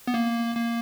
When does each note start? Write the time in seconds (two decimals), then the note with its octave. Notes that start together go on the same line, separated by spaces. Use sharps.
0.07 B3
0.14 A#3
0.55 A#3